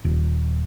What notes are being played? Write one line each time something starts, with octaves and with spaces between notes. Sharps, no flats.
D#1